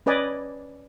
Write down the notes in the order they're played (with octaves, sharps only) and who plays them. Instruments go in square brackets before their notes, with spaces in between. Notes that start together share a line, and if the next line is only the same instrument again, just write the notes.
[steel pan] C#4 B4 D5 D#5 G#5